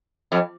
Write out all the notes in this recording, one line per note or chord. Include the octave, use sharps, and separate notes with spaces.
F2